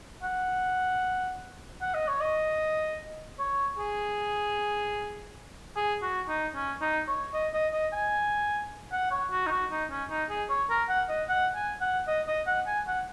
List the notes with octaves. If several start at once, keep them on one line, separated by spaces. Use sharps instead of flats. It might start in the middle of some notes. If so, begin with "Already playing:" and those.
F#5
F#5
D#5
C#5
D#5
C#5
G#4
G#4
F#4
D#4
C#4
D#4
C#5
D#5
D#5
D#5
G#5
F#5
C#5
F#4
D#4
F#4
D#4
C#4
D#4
G#4
C#5
A#4
F#5
D#5
F#5
G#5
F#5
D#5
D#5
F#5
G#5
F#5